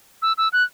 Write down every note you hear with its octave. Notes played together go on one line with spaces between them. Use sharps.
E6
E6
F#6